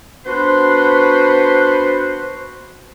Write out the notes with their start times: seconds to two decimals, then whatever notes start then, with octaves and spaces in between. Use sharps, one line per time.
0.25 B3 D4 F#4 B4 C5